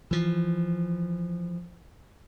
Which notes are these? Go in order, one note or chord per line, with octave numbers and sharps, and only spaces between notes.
E3 F3